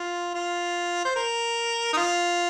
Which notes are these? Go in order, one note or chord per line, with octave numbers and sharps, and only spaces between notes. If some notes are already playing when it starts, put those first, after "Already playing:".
Already playing: F4
F4
C5
A#4
D#4
F4